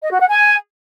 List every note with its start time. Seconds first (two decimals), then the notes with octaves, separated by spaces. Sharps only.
0.03 D#5
0.12 F#4
0.20 F#5
0.29 G#5